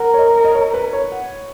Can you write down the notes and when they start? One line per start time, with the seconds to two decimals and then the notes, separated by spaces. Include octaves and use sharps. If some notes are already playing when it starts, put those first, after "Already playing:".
Already playing: A#4 F#5
0.14 C#5
0.18 D#5
0.45 D#5
0.55 C#5
0.74 B4
0.93 C#5
1.12 F#5